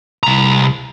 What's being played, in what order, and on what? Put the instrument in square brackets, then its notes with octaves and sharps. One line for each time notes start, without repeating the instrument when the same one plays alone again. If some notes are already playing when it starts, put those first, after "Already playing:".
[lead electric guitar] C2 A#5